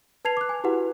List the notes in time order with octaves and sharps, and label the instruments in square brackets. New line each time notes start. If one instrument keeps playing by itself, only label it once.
[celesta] B4 A5 G#6 C7 F7
D6 F#6
G#5
E4 F#4 G4 B4 F#5